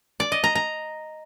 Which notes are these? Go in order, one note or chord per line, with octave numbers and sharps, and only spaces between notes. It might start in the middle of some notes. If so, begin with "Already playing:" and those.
D5
D#5
A#5
A#5